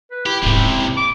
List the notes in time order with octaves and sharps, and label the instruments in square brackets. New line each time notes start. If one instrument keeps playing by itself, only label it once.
[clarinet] B4
[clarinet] E4 [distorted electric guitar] G4
[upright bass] D1 G#2 [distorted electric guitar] C#2 C3
[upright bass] A#3
[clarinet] D6